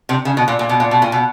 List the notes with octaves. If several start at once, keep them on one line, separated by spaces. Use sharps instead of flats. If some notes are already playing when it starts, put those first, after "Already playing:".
C3
C#3
B2
A#2
A#2
B2
A#2
B2
A#2
B2